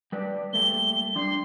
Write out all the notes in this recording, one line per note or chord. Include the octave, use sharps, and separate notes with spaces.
G3 B4 D5
G3 A3 A#3 G7
G3 D4 C6